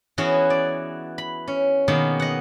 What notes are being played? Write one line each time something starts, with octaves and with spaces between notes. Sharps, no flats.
E3 B3 C#4 E4 F#4 G#4
D5
B5
C#4
B2 D#3 A#3 B3 G#4
D#5 F#5